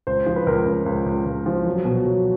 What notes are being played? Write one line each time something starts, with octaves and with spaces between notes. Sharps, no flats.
C#2 C5
F3
B4
C#2 A#4
C#2
C#2
C#2
C#2
F3
F#3
B2
F#3